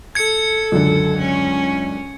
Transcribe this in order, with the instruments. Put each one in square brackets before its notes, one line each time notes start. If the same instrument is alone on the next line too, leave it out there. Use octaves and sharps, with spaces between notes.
[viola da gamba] A4 [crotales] G#6 C#7
[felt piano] C#2 F#2 D3
[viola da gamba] C#4